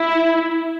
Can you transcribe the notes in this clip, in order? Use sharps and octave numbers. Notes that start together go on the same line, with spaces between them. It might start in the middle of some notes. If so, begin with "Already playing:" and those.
Already playing: E4